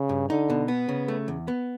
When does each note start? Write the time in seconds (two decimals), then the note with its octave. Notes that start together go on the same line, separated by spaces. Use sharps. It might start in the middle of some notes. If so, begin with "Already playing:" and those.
Already playing: C#3
0.09 G2
0.29 D3 D#4
0.50 B2
0.68 B3
0.89 C#3
1.08 A3
1.28 E2
1.48 B3